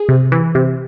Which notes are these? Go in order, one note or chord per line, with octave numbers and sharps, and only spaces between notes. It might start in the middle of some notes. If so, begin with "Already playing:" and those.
Already playing: G#4
C3
E3
C3